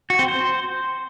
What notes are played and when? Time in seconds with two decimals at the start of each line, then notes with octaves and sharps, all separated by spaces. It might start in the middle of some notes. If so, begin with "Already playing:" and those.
0.10 F#4
0.19 C4
0.28 C5